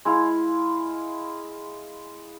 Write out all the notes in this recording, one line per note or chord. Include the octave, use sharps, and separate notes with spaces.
G#3 E4 F5